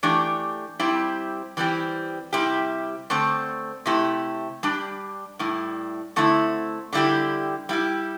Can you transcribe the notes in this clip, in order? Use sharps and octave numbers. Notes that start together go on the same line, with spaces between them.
E3 A3 D4 G4
G3 C4 E4 G4
E3 G3 C4 G4
C3 G3 E4 G4
D3 A3 C4
C3 A3 E4 G4
G3 D4 G4
A2 G3 E4
D3 A3 C4 E4
D3 G3 E4 G4
G3 E4 G4